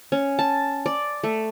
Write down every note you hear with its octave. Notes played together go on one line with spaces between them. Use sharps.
C#4
A5
D5
A3